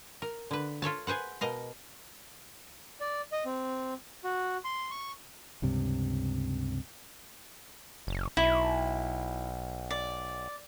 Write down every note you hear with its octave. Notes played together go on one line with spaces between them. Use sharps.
A#4
D3 B4
F4 A4 C#5 A5
G#4 B4 C5 F#5
B2 A#4 D#5 F5
D5
D#5
C4
F#4
C6
C#6
C#2 G2 C3
F#1
B1 E4
D5